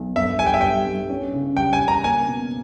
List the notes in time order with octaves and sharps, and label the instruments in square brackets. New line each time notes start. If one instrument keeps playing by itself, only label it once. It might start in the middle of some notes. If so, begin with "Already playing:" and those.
Already playing: [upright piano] B1
[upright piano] G1 [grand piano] E5
[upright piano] G3 [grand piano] G#5
[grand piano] G5
E5
[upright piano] G3 [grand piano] G5
[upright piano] G3
C#4
C#3
[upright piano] G3 [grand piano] G5
[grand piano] G#5
[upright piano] C#3
[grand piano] A#5
[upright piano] A#3 [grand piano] G#5
[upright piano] B2